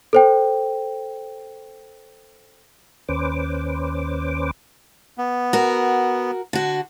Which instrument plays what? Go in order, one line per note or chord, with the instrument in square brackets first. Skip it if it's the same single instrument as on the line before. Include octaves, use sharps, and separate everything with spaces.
[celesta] A4 C5 G5
[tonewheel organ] D#2 C#4 B4 C5 D6
[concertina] B3
[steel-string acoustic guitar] F#4 A#4
D3 F#4